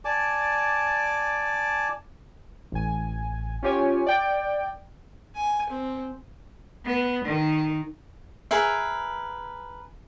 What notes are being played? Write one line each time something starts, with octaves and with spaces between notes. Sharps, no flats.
D5 G#5 A5 D6
A1 G#5
C#4 F4 G4 C#5 G#5
D5 G5
G#5
C4
B3
D#3
G#4 A#4 B4 E5